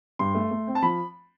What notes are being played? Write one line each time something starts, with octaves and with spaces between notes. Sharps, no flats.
G2 C6
A3
A3
C4
A5
F3 B5